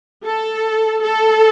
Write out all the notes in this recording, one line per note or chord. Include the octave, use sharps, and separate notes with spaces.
A4
A4